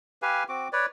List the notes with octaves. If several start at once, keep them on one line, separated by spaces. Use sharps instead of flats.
G4 B4 F5 G#5
C4 F#4 D6
B4 C#5 D5